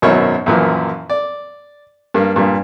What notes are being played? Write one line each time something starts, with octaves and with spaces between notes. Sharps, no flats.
G#1 F#2 B2 E4 A#4 C#5
F#2 A#2 E3 F3
D5
G2 A#3
G2 A#2